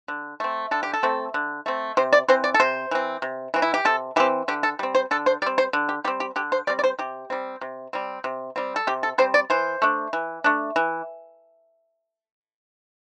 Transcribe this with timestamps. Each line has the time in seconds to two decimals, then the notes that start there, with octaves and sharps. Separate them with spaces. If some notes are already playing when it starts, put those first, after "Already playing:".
0.08 D3
0.40 A3 C4
0.71 D3 A4
0.83 G4
0.93 A4
1.03 A3 C4
1.34 D3
1.66 A3 C4
1.97 C3 C5
2.13 D5
2.28 E3 C4 C5
2.44 D5
2.54 A4
2.60 C3 C5
2.91 E3 C4
3.22 C3
3.54 E3 C4
3.62 E4
3.74 G4
3.85 C3 A4
4.16 E3 C4 G4
4.48 D3 G4
4.63 A4
4.79 G3 C4
4.95 C5
5.11 D3 A4
5.26 C5
5.42 G3 D5
5.46 C4
5.58 C5
5.73 D3
5.89 G4
6.04 G3 G4
6.07 C4
6.20 G4
6.36 D3 G4
6.52 C5
6.67 G3 C4 D5
6.79 D5
6.84 C5
6.99 C3 G4
7.30 G3 C4
7.61 C3
7.93 G3 C4
8.24 C3
8.56 G3 C4
8.76 A4
8.87 C3 G4
9.03 A4
9.18 G3 C4 C5
9.34 D5
9.50 E3 C5
9.82 A3 D4
10.13 E3
10.44 A3 D4
10.76 E3